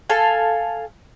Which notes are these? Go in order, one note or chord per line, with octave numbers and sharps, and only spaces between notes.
A4 F5 G#5